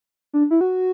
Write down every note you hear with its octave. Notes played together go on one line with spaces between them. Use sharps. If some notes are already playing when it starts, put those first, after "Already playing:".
D4
E4
F#4